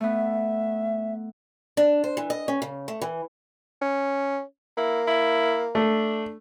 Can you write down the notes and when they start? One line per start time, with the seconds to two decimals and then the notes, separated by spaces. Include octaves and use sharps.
0.01 A3 B3 E5
1.77 D4
2.04 C5
2.17 E3
2.30 D#5
2.48 C#4
2.62 C#3
2.88 A3
3.02 E3
3.81 C#4
4.77 A#3 E4
5.07 E4
5.75 A3 D4